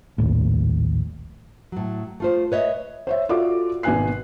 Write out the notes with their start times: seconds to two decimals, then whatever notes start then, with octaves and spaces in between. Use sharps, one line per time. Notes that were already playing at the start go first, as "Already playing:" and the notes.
0.18 A#1 D#2 A2
1.72 A2 F#3
2.20 A3 F4 C5
2.52 B4 C#5 D#5 E5
3.07 C5 C#5 E5
3.29 F4 F#4 A4 D5 E5 D6
3.83 G#1 B2 B4 G#5 F#6 C7